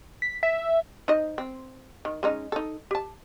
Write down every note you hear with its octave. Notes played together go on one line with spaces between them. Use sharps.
B6
E5
D#4 C5 D#5
C4
D#3
G#3 C#4 D#4
D#4 A4
G4 A5